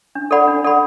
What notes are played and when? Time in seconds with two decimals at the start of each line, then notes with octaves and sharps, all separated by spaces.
0.15 D4
0.31 A4 D5 F#5 B5
0.47 D4
0.64 A4 D5 F#5 B5